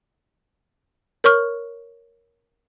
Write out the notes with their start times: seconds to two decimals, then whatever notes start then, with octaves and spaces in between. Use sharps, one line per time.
1.24 A#4 C#5 C#6 F6